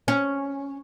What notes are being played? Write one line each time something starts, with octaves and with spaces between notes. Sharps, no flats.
C#4